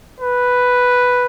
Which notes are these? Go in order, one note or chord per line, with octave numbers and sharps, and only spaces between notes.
B4